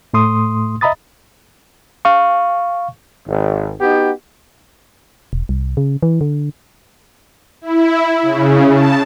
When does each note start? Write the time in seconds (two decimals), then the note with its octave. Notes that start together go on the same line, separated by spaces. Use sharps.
0.13 A2 A3 C6 D#6
0.81 D#5 E5 A#5 B5 D#6 A6
2.05 F5 C#6
3.26 G#1
3.80 B3 D#4 F#4 G4
5.33 E1
5.49 C2
5.77 C#3
6.03 E3
6.21 D3
7.61 E4
8.22 C#3
8.74 A5